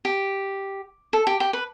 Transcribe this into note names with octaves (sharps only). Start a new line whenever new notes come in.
G4
A4
G4
G4
B4